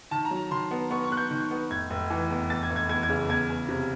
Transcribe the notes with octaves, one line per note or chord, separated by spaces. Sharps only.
D#3 A5
A#5
F#3
D#3 C6
B3
B3 C#6
C#6
B3 F#6
G6
D#3
B3
F1 G#6
F1
E3
E2
E2 A6
G#6
F1
G#6
E2 G#6
G#6
C#3
E2 G#6
E2
C3